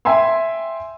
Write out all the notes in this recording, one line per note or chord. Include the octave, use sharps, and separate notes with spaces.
E5 G5 G#5 C6 E6